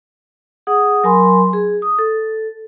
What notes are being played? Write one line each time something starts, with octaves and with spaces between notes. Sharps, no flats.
G#4 F#5 D#6
F#3 A#4 G#5 B5 C6
G#4
D#6
A4